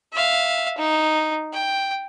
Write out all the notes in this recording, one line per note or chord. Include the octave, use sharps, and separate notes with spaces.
E5 F5
D#4
G5